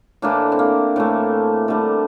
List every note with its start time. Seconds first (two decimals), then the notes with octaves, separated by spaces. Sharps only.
0.22 A2 E3 A3 A#3 D4
0.52 C4
0.59 A#3
0.96 A2 E3 A3
1.68 D3 G3 A3